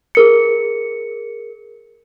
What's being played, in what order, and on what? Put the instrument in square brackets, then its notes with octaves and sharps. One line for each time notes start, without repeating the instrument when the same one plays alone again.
[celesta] G#4 A#4 C#7